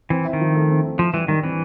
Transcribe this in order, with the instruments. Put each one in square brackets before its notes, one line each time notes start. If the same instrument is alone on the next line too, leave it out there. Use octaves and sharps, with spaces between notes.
[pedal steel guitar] E3 [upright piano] C4
[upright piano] E4
[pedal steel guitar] D#3
[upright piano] F3
A3
C4
E4
[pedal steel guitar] F3 [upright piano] E4
[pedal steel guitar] E3 [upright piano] G3
[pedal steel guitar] D#3 [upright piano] G3
[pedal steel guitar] E3 [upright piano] C4